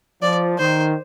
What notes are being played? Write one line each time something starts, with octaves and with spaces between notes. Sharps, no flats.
F3 D5
D#3 C5